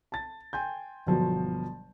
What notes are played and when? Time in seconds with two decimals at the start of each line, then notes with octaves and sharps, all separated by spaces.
0.12 A5 A6
0.53 G5 G#5 C6 G6
1.07 G1 B2 F3 F#3